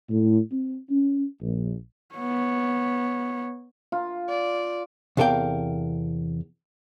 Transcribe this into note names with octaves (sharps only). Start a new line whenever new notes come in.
A2
C4
C#4
A#1
B3 C#5
F4
D5
E2 C3 A4 A#4 F5 G5